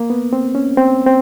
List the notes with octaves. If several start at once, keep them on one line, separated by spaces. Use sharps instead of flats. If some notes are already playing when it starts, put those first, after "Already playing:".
Already playing: A#3
B3
C4
C#4
C4
C4